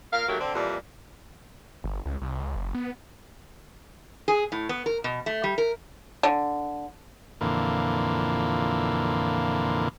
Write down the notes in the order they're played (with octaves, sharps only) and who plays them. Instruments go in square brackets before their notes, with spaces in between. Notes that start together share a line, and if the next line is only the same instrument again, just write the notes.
[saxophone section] A#2 A#4 F5
D#3 F#3 A3 A#3 G4
D3 C4
F2 A#2 E3 G3
[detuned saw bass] G1
C#2
C2
C#2
F#1
B3
[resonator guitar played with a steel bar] G#4
A2
B3
A#4
B2
A3
G3
A#4
[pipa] D3
[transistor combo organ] F2 A#2 D3 E3 A#3